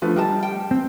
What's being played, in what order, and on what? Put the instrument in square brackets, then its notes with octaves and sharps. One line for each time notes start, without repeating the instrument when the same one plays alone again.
[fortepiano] D3 F3 A3 [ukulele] B4
[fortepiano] G3 [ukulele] A#4 D#5 A5
[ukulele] G5
[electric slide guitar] C4